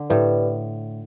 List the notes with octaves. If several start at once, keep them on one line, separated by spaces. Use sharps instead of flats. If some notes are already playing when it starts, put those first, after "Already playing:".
Already playing: D3
A2 G4 B4 D5